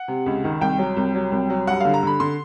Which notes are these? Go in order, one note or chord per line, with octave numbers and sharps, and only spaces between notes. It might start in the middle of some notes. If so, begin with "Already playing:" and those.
Already playing: F#5
C3
C#2
D#3
C2 G5
F#3
C2
F#3
C2
F#3
G2 F#5
D3 F5
A#5
D3 B5
D3 C6